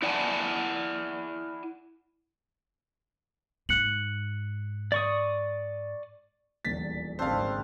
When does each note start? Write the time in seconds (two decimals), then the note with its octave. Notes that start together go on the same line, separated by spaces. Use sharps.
0.02 E4 D5 F#5 G#5 A5
3.69 G#2 F#6 C#7 F#7
4.92 D5 C#6 D#6
6.65 D#1 A#1 E2 A6 B6
7.19 G#1 C#3 C4 D4 A4 C5 F5